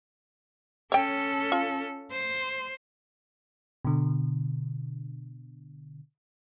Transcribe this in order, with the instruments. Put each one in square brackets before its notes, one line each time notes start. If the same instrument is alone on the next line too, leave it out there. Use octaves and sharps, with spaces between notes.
[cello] C#4 A4 [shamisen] C#5 G5
[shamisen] F4
[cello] C5
[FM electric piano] B2 D3